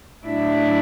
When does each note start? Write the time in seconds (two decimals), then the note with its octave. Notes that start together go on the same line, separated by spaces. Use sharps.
0.24 A2 F#3 D4 E4